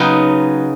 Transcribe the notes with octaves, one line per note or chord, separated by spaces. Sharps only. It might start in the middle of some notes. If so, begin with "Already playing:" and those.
Already playing: C#3 F#3 B3 D#4